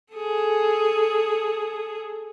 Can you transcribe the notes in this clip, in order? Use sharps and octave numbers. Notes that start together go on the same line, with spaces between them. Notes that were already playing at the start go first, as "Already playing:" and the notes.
G#4 A4